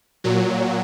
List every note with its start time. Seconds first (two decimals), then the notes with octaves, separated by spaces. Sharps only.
0.24 A#2 F#3